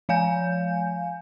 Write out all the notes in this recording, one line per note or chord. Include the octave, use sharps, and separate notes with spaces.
F3 F5 G#5 G6